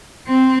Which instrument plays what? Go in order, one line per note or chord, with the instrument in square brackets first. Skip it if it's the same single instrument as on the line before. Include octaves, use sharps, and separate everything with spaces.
[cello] C4